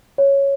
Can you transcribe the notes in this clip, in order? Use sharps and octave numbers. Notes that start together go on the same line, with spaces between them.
C#5